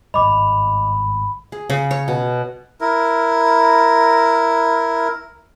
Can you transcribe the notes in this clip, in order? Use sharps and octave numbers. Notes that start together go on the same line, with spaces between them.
G#1 G2 D#5 B5 D6
G#4
C#3
C#5
B2
E4 A#4